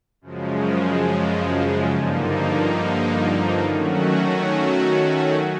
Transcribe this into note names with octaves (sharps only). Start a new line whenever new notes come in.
F#2 C#3 F3 G#3
G2 D3 F3 A#3 D#4
D#3 F#3 A3 C#4 F#4